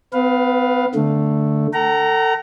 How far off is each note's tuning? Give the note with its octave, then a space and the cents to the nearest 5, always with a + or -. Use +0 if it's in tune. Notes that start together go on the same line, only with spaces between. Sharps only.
B3 +45 B4 +0 F5 +10
D3 +0 A3 +0
A4 +30 F#5 +45 A#5 +0